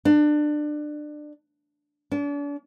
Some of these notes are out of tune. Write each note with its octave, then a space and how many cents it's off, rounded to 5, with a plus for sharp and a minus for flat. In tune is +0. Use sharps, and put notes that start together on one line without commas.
D4 +25
D4 -40